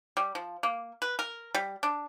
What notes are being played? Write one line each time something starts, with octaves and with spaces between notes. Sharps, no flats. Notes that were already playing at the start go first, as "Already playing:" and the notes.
G3
F3
A#3
B4
A#4
G3
D4